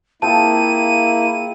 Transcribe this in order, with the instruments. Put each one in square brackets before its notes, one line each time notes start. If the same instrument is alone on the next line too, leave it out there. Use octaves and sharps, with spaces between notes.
[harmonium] A#3 E4 [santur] C4 F4 G#4 [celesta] A5 [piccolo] D#7